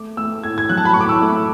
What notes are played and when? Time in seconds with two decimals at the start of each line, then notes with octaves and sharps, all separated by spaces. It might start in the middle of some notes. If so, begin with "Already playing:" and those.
Already playing: A3 D6
0.17 A3 E6
0.44 A2 G#6
0.58 G#6
0.69 F#3 F#6
0.77 A5
0.85 B5
0.94 A2 C#6
1.01 D6
1.09 E6
1.22 A3